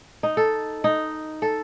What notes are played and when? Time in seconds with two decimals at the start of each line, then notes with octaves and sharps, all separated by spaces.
0.23 D#4
0.37 A4
0.84 D#4
1.42 A4